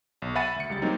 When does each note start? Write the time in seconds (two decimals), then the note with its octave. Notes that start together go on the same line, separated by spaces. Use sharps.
0.22 B1
0.35 E5 F#5 G#5 B5 A6 D#7
0.56 D2 C#7
0.70 C#2 G3 A6
0.82 F#3 A#3 C4 D#4